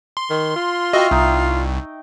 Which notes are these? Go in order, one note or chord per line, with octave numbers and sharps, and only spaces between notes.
C6
D#3
F4
F#4 D#5 E5 G5 C#6
C2 D#4